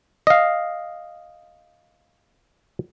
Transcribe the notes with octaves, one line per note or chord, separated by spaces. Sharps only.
D#5 F5